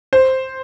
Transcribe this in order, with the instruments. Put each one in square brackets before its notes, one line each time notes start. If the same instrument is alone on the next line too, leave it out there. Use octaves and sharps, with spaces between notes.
[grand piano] C5